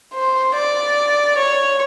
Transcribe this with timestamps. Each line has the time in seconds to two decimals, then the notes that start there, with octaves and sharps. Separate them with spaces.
0.15 C5
0.55 D5
1.38 C#5